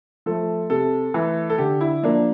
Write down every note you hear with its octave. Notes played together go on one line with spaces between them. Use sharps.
F3 A3 A4
C3 A4
E3 A3
A4
D3 G4
E4
F3 A#3 D4